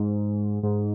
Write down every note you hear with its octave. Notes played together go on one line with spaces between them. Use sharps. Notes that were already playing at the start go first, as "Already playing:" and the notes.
Already playing: G#2
G#2